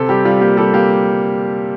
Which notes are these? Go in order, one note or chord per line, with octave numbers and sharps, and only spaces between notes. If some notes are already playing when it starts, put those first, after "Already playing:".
Already playing: C3 A4
G3 G4
G3 F4
A#3 G4
G3 A4
A#3 G4